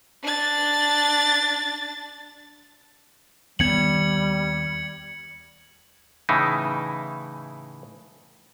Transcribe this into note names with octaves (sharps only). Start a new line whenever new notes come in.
D4 A6
D#2 G3 B3 G#6 C#7 F#7
A2 C#3 E3 D#4 E4